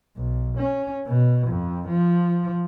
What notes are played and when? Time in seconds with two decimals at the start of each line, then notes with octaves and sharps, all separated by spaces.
0.16 B1
0.58 C#4
1.07 B2
1.48 F2
1.88 F3